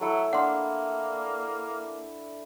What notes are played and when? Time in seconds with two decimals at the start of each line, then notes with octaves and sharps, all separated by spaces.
0.01 F#3 A3 E4 A4
0.33 A#3 D4 F#5 C6